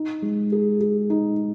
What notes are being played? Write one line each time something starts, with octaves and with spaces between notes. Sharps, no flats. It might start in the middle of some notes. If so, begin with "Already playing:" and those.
Already playing: D#4
G#3
G#4
G#4
D#4